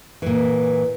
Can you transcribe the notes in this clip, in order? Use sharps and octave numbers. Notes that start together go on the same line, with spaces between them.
A#2 E3